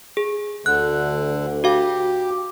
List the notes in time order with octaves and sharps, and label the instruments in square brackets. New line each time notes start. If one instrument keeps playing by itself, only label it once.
[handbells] G#4
[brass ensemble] D2 [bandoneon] D3 [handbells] F#6
[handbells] F#4 F5 [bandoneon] G4